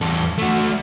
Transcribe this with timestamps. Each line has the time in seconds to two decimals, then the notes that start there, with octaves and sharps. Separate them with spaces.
0.02 E2 A4
0.38 A3 F#4